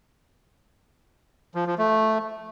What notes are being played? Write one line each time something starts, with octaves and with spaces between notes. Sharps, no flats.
F3
F3
A3